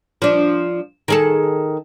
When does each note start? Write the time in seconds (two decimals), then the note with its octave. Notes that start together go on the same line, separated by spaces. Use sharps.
0.22 F3 D4
1.08 D#3 G#4 A4